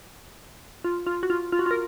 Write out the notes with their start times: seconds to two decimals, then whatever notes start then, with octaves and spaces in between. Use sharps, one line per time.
0.84 F4
1.07 F4
1.23 F#4
1.30 F4
1.52 F4
1.59 F#4
1.66 F4
1.71 A#4